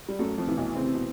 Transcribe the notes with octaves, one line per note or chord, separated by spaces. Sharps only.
G3
F#2 F#3 A3
F2 F3
C3 E3
B1 B2
C#3 C4
C3
B2